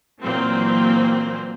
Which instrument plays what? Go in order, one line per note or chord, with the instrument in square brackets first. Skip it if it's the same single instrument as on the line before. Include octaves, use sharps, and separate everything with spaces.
[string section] A#2 E3 F#3 A#3 C4